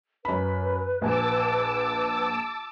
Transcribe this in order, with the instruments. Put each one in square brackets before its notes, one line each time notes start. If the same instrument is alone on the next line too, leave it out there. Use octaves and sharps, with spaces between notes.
[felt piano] F#2 B5 [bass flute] B4
[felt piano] A#1 G#5 [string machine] A5 D6 E6